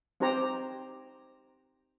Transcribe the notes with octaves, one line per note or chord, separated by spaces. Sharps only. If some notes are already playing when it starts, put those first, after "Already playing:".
C4 D#4 G4 C5 A#5